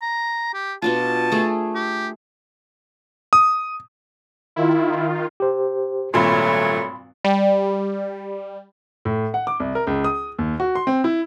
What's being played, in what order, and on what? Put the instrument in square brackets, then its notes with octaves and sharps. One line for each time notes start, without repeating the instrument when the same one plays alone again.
[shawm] A#5
G4
[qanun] B2 D4 F4 [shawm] A5
[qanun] A3 G#4
[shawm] G4
[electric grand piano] D#6
[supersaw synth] D#3 F4 [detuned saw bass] E4
[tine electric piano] G4 C5
[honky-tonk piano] G#1 G2 A#2 [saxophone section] F#3 A3 C#5 [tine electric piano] B5 C6
[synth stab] G3
[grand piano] A2
F#5
D6
C2
A#4
C#2
D#6
D#2
F#4
C6
C4
E4